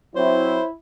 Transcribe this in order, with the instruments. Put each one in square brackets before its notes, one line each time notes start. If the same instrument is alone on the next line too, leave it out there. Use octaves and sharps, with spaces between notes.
[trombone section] F#3 C4 [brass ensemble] E4 [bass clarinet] C5 [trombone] C#5